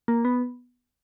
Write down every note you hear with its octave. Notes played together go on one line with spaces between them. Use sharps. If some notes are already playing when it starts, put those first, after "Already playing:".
A#3
B3